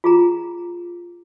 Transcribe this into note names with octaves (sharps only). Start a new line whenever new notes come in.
F4 G#4 A#5